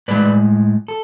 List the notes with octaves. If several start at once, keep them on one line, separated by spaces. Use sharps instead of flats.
A2 G#3 B4 D5
A4